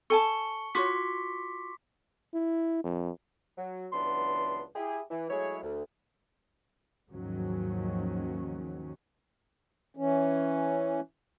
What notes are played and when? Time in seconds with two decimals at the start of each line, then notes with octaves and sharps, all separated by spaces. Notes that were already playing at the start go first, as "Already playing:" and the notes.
0.10 A4 G#5 A5 C#6 C#7 G7
0.75 F4 F#4 C#5 C6 D6 B6
2.34 E4
2.84 F2
3.58 F#3
3.93 C#2 E3 F#3 B3 D4 C6
4.76 E4 G4 G#4
5.11 E3
5.30 F#3 G#3 A3 E4 G#4 C#5
5.63 D2
7.11 D#2 G#2 D#3 F3 F#3 C#4
9.97 E3 C#4